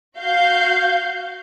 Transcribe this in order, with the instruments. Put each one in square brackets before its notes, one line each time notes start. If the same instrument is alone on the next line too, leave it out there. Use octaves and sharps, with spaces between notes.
[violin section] F#4 F5 G6